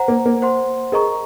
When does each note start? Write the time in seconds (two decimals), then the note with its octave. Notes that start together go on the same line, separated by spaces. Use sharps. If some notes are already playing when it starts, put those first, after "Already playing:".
Already playing: C5 F#5 A#5
0.08 A#3
0.26 A#3
0.42 C5 F#5 C6
0.92 G#4 A#4 D#5 A#5 C#6